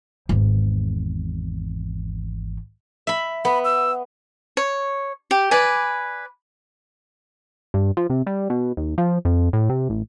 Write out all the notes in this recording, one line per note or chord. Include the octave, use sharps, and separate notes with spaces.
G#1 E2
E5 B5
B3 B5
E6
C#5
G4
B4 D5 G#5
G2
F3
C3
G3
B2
D#2
F3
F2
A2
C3
A1